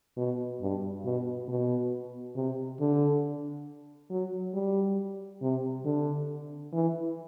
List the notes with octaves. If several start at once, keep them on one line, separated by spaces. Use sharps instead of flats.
B2
G2
B2
B2
C3
D3
F#3
G3
C3
D3
E3